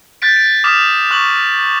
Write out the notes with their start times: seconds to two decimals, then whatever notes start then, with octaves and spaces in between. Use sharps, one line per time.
0.22 F#6 G6 A6 B6 D7
0.36 D7
0.64 D6 D#6 F6 B6 E7
1.11 C#6 F#6 F#7